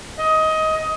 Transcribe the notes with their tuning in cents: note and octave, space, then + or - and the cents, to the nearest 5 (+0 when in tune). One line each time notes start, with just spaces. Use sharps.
D#5 +20